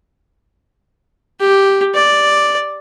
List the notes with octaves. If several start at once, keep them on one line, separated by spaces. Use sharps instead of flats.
G4
D5